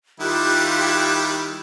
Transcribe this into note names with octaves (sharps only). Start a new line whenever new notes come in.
D#3 G3 E4 F4 G4 F#6